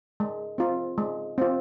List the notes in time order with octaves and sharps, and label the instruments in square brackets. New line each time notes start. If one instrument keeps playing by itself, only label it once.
[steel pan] G#3
C4 F4
G#3
C4 F4